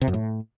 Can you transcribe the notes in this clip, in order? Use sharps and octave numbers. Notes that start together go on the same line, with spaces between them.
C3
F#2
A2